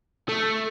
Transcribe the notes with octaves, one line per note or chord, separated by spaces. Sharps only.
A3